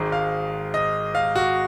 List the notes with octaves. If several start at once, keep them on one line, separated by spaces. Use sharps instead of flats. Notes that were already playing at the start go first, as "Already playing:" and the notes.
Already playing: G#1 G#2 D#3 G#3
F5
D#5
F5
F#4